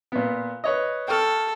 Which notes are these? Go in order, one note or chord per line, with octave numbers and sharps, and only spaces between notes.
A#2 B3
B4 C#5 D#5
A4 G5 C#6 F6